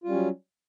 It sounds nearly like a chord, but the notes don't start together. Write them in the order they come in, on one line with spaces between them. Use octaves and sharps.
F4 G3 C#4 F#3